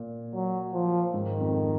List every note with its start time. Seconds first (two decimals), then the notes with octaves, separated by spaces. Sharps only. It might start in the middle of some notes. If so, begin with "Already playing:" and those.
Already playing: A#2
0.34 F#3
0.73 F3
1.14 G#2 D#3
1.40 F2